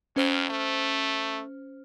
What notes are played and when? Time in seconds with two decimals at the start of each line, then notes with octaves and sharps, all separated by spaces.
0.16 F2 C#4 C5 F6
0.50 A3